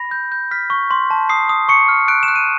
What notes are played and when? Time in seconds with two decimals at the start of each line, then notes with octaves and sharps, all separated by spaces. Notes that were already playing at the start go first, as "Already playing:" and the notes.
Already playing: B5 A#6
0.11 G6
0.32 G6
0.51 F6 B6
0.70 C#6
0.91 C6
1.10 A5
1.29 D#6 C7
1.49 D#6
1.69 C#6 C#7
1.89 F6
2.08 F#6 D7
2.23 E7
2.28 F#6
2.36 D#7